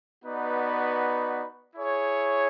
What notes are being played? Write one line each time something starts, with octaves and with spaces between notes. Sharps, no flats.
B3 D#4 F#4 B4 D5
E4 G#4 C#5